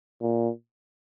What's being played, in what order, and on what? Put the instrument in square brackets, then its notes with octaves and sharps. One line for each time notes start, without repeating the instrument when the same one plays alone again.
[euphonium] A#2